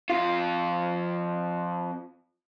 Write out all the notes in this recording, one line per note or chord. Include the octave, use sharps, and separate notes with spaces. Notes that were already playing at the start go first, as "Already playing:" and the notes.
F2 F4